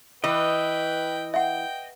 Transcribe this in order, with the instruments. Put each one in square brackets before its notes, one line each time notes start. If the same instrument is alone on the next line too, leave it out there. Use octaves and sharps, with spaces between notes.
[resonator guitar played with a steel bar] E3 [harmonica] B4 G5 [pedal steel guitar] D#5
[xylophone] E5 F#5 [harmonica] G5